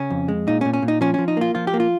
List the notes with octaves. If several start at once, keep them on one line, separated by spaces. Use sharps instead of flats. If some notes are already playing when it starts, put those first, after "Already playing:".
Already playing: C#3 C#4
F2
G#3
A#2 D#4
C#4
A#2
C#4
A#2
D#4
F3 C#4
C#4
F3
D#4
A#3 F4
F3 F4
G4
A#3
F4